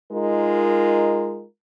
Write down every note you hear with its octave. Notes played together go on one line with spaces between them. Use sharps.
G#3 D#4 F4 A#4